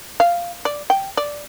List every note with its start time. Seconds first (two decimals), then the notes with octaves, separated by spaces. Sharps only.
0.20 F5
0.65 D5
0.90 G5
1.17 D5